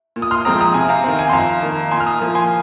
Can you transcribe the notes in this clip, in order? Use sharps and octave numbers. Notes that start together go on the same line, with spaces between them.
A#2
D#6
C6 F6
F3 G#3 C4 A#5 D#6
A#5 D#6
C3 G#5
F5 A#5
D#3 C4 F5
G#5
C6
F2 F5 A#5
D#3 A#3
A#2 G#5 C6
F6
A#5 D#6
F3 A#3
G#5 C6